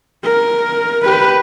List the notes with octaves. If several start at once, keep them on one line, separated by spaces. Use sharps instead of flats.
A#4
G4 B4